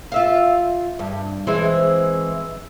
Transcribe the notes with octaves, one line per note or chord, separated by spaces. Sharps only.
F4 E5 F5
G2
E3 G#3 C4